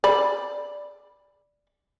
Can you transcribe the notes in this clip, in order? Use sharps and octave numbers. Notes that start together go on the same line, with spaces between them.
D5 B5